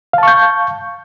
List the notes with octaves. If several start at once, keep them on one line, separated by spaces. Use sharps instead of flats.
F5 A5 C#6 G6